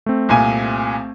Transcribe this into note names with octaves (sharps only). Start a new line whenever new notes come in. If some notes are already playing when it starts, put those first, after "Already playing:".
A3 C4
C2 A#2 G#5